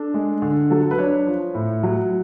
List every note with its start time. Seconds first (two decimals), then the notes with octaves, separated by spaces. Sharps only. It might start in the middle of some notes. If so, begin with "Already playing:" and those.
Already playing: D4 A4
0.14 G#3
0.42 D3
0.70 F#3 A4
0.91 B4
0.98 D4 C#5
1.27 F3
1.54 A2
1.83 F#3